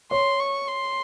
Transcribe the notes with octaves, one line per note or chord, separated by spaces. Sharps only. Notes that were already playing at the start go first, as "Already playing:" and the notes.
C#5 C6
C#6
C6